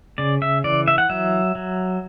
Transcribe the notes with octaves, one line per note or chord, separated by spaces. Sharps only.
C#3 D5
E5
E3 D5
E5
F#5
F#3 E5
F#3